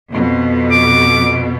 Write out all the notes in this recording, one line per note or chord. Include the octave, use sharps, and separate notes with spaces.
F2 B2
D6